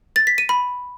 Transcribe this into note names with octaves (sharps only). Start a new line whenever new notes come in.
A6
B6
D#7
B5